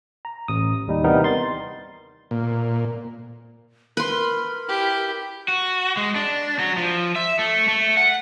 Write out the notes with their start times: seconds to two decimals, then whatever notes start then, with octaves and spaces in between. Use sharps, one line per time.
0.25 A#5
0.48 A1 D#6
0.87 D#2 G3 D#4
1.04 C3 E3 G3 B3 D#4 A#4
1.24 C6 A6
2.31 A#2
3.97 A#4 B4 C6
4.68 E4 G4
5.48 F#4
5.97 G#3
6.16 D4
6.59 F#3
6.77 F3
7.16 E5
7.39 A3
7.68 A3
7.97 F#5